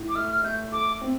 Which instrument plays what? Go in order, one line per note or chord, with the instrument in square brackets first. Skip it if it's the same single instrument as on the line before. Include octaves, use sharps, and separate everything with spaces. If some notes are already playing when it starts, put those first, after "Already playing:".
Already playing: [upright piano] A2
[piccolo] D6
[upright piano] A3 [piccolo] F6
[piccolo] F6
[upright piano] A3 [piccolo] G6
[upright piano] A4 [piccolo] D6
[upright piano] C4